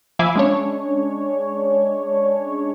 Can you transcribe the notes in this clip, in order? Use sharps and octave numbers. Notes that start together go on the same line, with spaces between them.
F3 E5 F5 G#5 B5 D6
G#3 C#4 D4 C#5